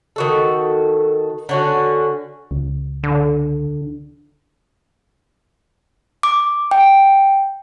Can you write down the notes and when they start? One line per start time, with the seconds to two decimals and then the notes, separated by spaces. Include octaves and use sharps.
0.16 D#3 F#4 A4
1.49 D3 C#4 F#4
2.51 C#2
3.03 D3
6.23 D6
6.71 G5